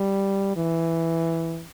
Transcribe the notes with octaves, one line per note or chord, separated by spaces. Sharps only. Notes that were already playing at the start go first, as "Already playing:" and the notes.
Already playing: G3
E3